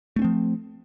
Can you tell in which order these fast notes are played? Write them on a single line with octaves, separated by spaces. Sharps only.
A3 C#4 C4 F3